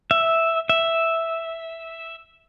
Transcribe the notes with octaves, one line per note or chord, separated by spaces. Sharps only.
E5
E5